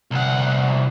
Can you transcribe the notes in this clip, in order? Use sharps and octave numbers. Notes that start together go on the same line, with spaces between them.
C2 F#5